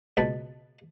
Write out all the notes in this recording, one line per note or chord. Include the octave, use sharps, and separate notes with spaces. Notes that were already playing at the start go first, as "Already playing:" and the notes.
C#2 B2 B4 A5